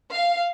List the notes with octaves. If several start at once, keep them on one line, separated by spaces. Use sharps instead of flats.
F5